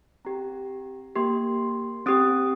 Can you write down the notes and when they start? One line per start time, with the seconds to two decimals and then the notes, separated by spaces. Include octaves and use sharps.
0.25 C4 G4 A#5
1.15 A#3 G4 C6
2.06 C4 G4 D#6